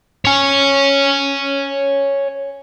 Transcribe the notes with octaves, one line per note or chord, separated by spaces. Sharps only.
C#5 G#5